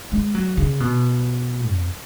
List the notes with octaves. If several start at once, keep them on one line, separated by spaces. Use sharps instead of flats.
G#3
F#3
C#3
B2
F2